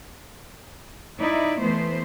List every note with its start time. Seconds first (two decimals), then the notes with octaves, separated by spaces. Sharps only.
1.18 D#4 E4 D5
1.61 E3 A3 B3 C5